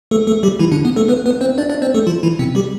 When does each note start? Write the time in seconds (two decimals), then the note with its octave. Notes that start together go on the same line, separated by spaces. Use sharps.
0.11 A3 A4
0.27 A3 A4
0.43 G3 G4
0.59 E3 E4
0.72 D3 D4
0.85 B3
0.96 A3 A4
1.08 B3 B4
1.26 B3 B4
1.41 C4 C5
1.58 D4 D5
1.70 D4 D5
1.82 C4 C5
1.94 A3 A4
2.07 F3 F4
2.23 E3 E4
2.39 C3 C4
2.55 G3 G4